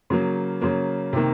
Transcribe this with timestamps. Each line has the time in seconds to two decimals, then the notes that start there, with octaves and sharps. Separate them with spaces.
0.10 C#3 F#3 A#3
0.61 C#3 F#3 A#3
1.13 C3 D#3 A#3